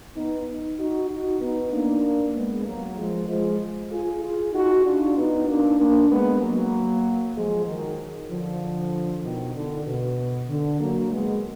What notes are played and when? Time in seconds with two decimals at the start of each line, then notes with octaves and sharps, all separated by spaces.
0.15 B3 D#4
0.78 D#4 F#4
1.09 D#4 F#4
1.40 B3 D#4
1.72 A#3 D4
2.35 G#3 B3
2.65 F#3 A#3
2.97 F3 G#3
3.28 F3 G#3
3.90 F4 G#4
4.23 F4 G#4
4.53 D#4 F#4
4.85 D4 F4
5.16 B3 D#4
5.48 A#3 D4
5.79 A#3 D4
6.10 G#3 B3
6.41 F#3 A#3
7.35 F3 G#3
7.66 D#3 F#3
8.29 D3 F3
9.23 B2 D#3
9.54 D3
9.86 B2
10.48 D3
10.79 F#3 A#3
11.11 G#3 B3